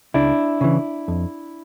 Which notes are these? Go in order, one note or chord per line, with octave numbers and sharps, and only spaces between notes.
C#2 D4 E4
C#3 E3
F2